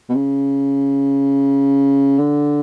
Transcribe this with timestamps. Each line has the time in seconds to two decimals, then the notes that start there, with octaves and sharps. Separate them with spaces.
0.09 B2
0.15 C#3
2.18 D3